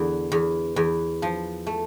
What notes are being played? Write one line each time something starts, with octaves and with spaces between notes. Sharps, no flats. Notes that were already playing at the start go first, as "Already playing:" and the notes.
Already playing: E2 D3
E2
E2
F3
A3